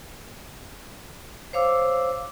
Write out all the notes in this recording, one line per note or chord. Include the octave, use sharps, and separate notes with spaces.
C5 C#5 F5 D6 E6